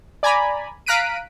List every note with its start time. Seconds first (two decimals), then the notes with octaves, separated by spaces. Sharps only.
0.23 D5 G#5 A#5 B5
0.86 F5 A#5 F#6 B6 D7 D#7